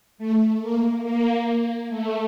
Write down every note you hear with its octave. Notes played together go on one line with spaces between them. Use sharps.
A3
A#3
A#3
A3